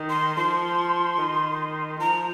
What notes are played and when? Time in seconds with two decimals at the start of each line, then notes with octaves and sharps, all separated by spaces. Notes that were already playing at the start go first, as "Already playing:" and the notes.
Already playing: D#3
0.10 C6
0.37 F3 C6
1.18 D#3
2.01 F3 A#5